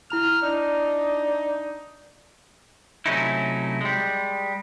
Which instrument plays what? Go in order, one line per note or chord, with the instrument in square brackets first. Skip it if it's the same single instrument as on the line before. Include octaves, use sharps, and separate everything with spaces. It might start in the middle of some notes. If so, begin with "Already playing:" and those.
[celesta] E4 A#5 F7 [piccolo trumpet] F6
[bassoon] D4 [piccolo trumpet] D#4
[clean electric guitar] C3 F#3 A3 C#4 D#4 E4
G3 G#3